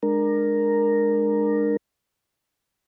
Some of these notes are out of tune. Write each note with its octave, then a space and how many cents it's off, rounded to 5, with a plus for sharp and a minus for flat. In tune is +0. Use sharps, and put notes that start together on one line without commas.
G#3 +0 D4 +25 A#4 +0